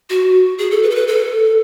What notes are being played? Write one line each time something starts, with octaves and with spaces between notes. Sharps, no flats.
F#4
G#4
A4
B4
A4
B4
A4